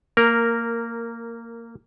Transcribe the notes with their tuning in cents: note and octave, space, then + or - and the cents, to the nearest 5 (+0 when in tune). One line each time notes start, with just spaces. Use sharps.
A#3 -15 A#4 +0